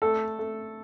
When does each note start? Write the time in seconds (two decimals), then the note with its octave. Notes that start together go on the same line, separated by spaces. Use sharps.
0.02 A3 A4
0.39 A3